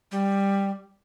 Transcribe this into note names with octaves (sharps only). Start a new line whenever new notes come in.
G3